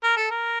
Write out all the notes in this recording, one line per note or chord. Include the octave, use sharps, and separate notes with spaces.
A#4
A4
A#4